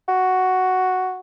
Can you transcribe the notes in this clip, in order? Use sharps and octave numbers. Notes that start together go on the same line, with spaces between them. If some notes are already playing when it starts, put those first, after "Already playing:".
F#4